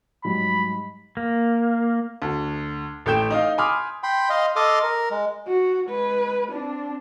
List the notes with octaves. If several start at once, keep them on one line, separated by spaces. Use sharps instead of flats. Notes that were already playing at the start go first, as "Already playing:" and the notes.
G#2 F#3 G3 B5
A#3
D2
A1 A3 G5 G6 E7
D#4 D#5 F5
G#5 B5 C6 D6 D#6 F6
G5 B5 C6
D#5 F5 C6
A4 D#5 C6 D6 D#6 F6
A#4
G#3
F#4
G#3 B4
C4 D4